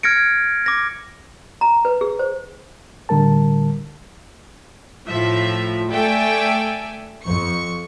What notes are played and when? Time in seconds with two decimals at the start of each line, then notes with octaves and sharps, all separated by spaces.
0.03 F6 G#6 A#6 C#7 D7
0.66 D6 A#6
1.61 A#5
1.85 B4
2.01 G#4
2.19 C5
3.09 A2 D3 G3 A#4 A5
5.08 A2 F3 E5
5.90 A3 A4 D5 E5 G5 G#5
7.24 F2 C#6 C#7